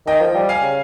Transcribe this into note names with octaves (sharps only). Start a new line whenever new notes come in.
D#3 D#5 G5
F3
G3
F5 G#5
C#3